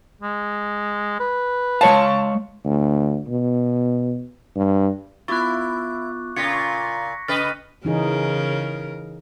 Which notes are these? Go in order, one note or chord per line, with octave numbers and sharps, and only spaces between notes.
G#3
B4
G#3 C#5 F5 A5
D2
B2
G2
B3 E4 F4 C#6 D6 F#6 A6
A#2 C#3 F4 G#6 A#6 B6 C#7
C#6
C#3 B4 D#5 F6 A6 B6 D#7
C#3 E3 D#4 G#4 A#4